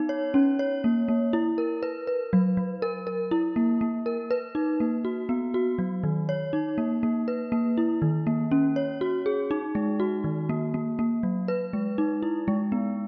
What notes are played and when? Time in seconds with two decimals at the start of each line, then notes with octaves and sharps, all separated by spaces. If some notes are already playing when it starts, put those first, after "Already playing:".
Already playing: B3 D#4
0.09 C#5
0.34 C#4
0.59 C#5
0.84 A#3
1.08 A#3
1.33 E4
1.58 A#4
1.83 B4
2.07 B4
2.33 F#3
2.57 F#3
2.82 A#4
3.07 A#4
3.31 E4
3.56 A#3
3.81 A#3
4.06 A#4
4.31 B4
4.55 D#4
4.80 A#3
5.05 F#4
5.29 B3
5.54 F#4
5.79 F#3
6.04 D#3
6.29 C#5
6.53 D#4
6.78 A#3
7.03 A#3
7.28 B4
7.52 A#3
7.77 E4
8.02 D#3
8.27 A#3
8.51 C#4
8.76 C#5
9.01 F#4
9.26 G#4
9.51 D#4
9.75 G#3
10.00 F#4
10.24 D#3
10.49 A#3
10.74 A#3
10.99 A#3
11.23 F#3
11.48 B4
11.73 G#3
11.98 D#4
12.22 E4
12.48 G#3
12.72 B3